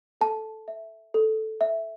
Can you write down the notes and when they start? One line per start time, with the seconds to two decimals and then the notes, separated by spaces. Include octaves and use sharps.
0.21 A4 A5
0.68 E5
1.14 A4
1.61 E5